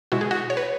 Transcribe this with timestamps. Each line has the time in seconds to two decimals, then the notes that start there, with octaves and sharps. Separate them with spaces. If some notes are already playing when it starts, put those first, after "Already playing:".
0.12 B2 G#3 E4 F#4
0.21 G#4
0.31 F#4
0.50 C#5
0.57 B4